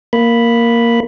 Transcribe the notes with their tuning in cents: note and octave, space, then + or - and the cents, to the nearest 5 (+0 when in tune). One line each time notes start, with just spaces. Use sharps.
A#3 +0 B5 +0